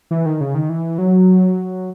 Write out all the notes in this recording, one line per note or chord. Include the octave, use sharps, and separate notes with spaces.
E3
D#3
C#3
D#3
E3
F#3